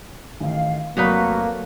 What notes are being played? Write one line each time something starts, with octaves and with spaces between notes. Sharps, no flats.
A1 D#3 F5
F1 F#3 A3 A#3 F#4 B4 D5 D#6